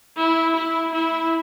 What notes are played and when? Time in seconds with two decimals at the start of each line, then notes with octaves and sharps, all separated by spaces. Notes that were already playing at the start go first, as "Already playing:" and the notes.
0.20 E4
0.57 E4
0.93 E4